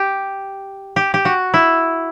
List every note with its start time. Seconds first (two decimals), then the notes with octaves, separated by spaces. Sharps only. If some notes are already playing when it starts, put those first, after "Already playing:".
Already playing: G4
0.96 G4
1.14 G4
1.25 F#4
1.54 E4